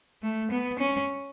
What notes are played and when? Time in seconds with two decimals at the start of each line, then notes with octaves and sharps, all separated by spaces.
0.22 A3
0.51 B3
0.79 C#4